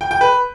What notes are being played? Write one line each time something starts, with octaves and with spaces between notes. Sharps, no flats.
G5
G5
B4